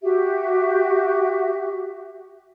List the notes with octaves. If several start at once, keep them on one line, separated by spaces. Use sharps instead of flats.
F#4 G4 E5